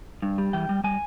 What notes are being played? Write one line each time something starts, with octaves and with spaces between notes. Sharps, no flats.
G2
G3
E3 G5
G3
G3 G#5